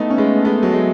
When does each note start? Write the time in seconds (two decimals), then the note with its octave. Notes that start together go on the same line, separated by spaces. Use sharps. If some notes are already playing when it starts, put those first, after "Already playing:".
Already playing: A3 B3 D#4
0.10 C#4
0.18 G#3 B3
0.45 G#3 B3
0.63 F#3
0.72 G#3